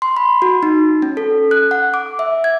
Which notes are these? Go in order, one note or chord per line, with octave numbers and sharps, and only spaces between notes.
C6
B5
F#4
D#4
C#4
A4
F#6
F#5
D6
E5
G#6